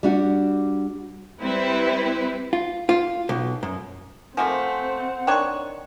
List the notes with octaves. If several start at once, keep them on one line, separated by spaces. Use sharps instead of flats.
G3 D4 F#4
G3 C4 E4 B4
F4
F4
B1
F#2
F3 A3 A#3 C4 F#5 G#5
D#3 D4 C#5 G5 C6